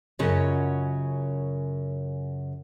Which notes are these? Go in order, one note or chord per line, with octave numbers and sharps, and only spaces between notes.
F#2 C#3 F#3 C#4 F4 D#5